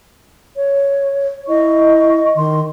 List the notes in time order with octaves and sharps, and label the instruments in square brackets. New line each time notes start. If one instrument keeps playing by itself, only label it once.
[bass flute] C#5
[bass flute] E4 [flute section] D#5 C#6
[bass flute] D#3 [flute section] C6